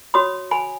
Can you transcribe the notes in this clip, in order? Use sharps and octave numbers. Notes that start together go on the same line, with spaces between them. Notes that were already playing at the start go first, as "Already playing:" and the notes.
F#4 C#5 B5 D#6
G#5 B5